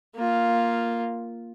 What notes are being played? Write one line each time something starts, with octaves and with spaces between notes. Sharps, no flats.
A#3 F4